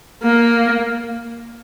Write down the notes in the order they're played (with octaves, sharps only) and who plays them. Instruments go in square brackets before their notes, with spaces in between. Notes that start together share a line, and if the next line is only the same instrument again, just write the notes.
[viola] A#3